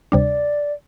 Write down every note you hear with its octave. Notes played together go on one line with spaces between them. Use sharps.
D2 C3 G3 D4 D5